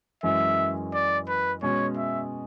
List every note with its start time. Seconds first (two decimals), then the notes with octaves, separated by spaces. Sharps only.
0.23 F#2 E3 G#3 C#4 E5
0.94 D5
1.28 B4
1.63 B2 G#3 C#4 C#5
1.97 E5